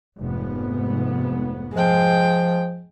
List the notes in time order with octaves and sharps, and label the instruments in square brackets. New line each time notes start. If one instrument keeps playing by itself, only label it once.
[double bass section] F1 G#2 B3
[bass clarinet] F3 [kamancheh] G#3 G5